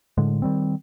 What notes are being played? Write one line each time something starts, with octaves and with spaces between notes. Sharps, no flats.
A2 D3 G#3
D#3 G3 C4